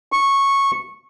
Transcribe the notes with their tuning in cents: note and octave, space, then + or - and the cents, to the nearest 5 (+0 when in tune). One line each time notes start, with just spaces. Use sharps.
C#6 -10